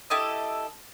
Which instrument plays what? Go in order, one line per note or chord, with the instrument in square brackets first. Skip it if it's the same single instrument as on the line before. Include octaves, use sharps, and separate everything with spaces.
[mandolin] E4 G4 A4 D#5